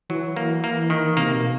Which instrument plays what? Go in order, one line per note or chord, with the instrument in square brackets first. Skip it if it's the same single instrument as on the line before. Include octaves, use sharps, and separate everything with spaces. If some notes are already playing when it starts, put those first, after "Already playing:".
[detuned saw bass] E3 [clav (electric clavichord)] F#3
[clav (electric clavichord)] A#3
A#3
D#3
[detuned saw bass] C3 [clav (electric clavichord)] A#3
[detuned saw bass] B2